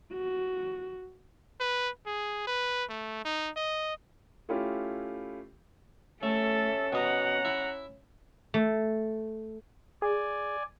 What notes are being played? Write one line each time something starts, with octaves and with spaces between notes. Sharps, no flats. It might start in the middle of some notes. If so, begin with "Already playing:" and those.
F#4
B4
G#4
B4
A3
D#4
D#5
A3 C#4 E4 F4 G4
A3 C#4 A4 E5
B2 D#5 F#5 A#5
E4
A3
G#4 D5 G#5